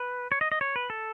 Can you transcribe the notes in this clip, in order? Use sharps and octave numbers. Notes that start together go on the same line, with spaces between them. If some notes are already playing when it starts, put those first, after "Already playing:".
Already playing: B4
C#5
D#5
D#5
C#5
B4
A4